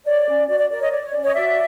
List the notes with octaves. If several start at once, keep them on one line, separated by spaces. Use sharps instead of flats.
C#5 D5
C#4
F#4 D5
D5
A#4 D5
C#5 D#5
C#5 D5
C#5
C#4 D5
C#5 D#5
F#4 D5 E5